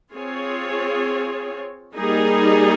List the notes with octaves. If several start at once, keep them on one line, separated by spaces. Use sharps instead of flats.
C4 F4 G#4 C#5
G3 A#3 D#4 G#4